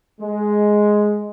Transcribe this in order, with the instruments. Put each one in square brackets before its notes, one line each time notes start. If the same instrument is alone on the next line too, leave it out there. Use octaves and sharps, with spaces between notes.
[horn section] G#3